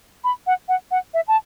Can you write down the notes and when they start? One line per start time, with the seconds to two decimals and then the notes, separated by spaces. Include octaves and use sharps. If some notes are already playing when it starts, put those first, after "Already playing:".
0.24 B5
0.47 F#5
0.68 F#5
0.91 F#5
1.14 E5
1.28 A5